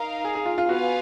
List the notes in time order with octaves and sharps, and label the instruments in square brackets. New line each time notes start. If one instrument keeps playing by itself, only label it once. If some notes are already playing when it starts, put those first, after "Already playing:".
Already playing: [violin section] D#4 A#4 F5
[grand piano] G#4
G#4
F4
F4
[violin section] B3 F4 B4 F5 G#5 [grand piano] F#4